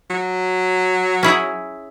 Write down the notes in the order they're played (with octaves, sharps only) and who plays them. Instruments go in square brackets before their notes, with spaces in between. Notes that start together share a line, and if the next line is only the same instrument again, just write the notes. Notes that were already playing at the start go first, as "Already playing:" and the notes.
[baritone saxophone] F#3
[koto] C#4 E4 G#4